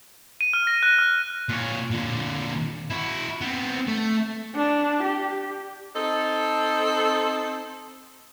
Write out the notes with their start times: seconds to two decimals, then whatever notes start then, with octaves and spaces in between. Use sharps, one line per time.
0.41 D#7
0.53 F6
0.67 A#6
0.83 F#6
0.99 F6
1.49 A#2 C#5
1.91 A#2 D3
2.90 E4 F#4
3.41 B3 C4
3.87 A3
4.55 D4
5.03 G4
5.96 C4 D#4 A4